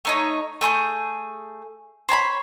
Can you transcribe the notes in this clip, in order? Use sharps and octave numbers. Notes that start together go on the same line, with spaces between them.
A3 D#4 C#5
A3 G#4 C6 G6
C5 C#5 A5 B5